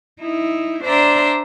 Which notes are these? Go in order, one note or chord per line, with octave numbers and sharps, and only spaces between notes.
D#4 E4
D4 C5 D5 E5 A#5 C6